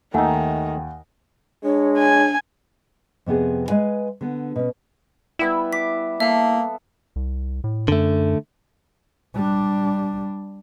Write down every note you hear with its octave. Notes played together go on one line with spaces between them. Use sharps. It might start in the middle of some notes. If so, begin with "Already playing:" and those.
D#2 D#3 A3 D#4 F#5 G#5
G#3 D4 C#5
G#5
F2 C3 B3 G#4
G#3 B4 F5 G#5
D3 B3
B2 C#4
G3 B3 E4 E5
D6 B6
A#3 A4 E5 F5
C2
A2
F#2 D3 A3
G3 D4